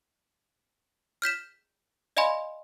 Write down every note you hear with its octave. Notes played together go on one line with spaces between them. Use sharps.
F6 G6 B6 E7
D5 D#5 F5 G#5 B5 C6